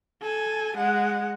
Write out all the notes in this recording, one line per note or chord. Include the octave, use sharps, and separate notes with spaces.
A4 G#5
G#3 F#5